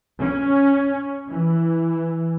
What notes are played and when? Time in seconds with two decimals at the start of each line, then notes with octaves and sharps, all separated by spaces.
0.21 C#4
1.30 E3